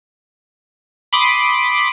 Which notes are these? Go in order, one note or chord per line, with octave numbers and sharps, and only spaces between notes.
B5 C6 D6 D#6